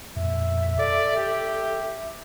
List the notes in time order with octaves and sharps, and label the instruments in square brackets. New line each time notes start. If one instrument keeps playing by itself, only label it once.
[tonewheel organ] F2 A#2 [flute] E5
[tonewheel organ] A4 [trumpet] D5
[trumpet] G4